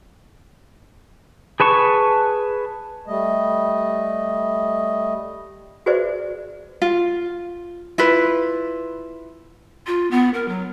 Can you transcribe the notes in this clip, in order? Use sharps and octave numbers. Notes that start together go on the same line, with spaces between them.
G#4 B4 A5 C#6
G3 A3 D#5
F#4 G#4 B4 C5 D5 E5
F4
E4 F4 B4
F4
B3
A#4
F#3